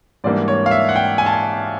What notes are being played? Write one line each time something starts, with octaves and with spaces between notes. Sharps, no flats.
G#2 E3 G3 A#3 D4 D5
C#5
F5
E5
F#5
G5
G#5
A5
G#5